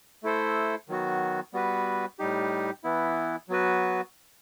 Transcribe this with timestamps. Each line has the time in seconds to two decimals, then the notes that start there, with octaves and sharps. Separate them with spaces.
0.23 A3 E4 A4 C5
0.88 D#3 F#3 B3 F#4
1.53 G3 B3 F#4 B4
2.19 A2 G3 D#4 G4
2.84 E3 B3 E4
3.48 F#3 B3 F#4 B4